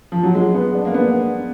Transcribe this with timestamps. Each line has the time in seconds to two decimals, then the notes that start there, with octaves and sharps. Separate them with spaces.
0.12 F3
0.23 F#3
0.35 G#3
0.54 B3
0.75 D4
0.85 A#3
0.94 B3